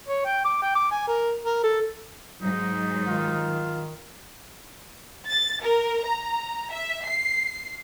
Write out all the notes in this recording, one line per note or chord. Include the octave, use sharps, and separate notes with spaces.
C#5
G5
D6
G5
D6
G#5
A#4
A#4
A4
G#2 F#3 D#4
D#3 F4
A6
A#4
A#5
E5
C7